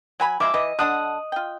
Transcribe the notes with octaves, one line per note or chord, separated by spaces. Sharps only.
F#3 G#5 B5
F3 G#3 E4 E5 D6
E3 D#5
D3 D4 F#5 D#6 F#6
F4 G5